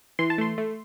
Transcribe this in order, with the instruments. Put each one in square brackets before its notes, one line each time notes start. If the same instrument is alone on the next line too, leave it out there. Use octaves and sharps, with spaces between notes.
[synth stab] E3 C6
A5
A3 C6
A3